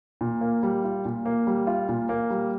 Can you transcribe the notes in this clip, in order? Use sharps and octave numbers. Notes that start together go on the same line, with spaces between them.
A#2
A#3
G3
F4
A#2
A#3
G3
F4
A#2
A#3
G3